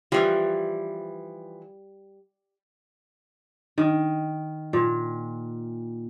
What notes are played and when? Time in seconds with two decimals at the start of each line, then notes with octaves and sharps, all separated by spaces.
0.12 E3 F3 G3
3.78 D#3
4.73 A#2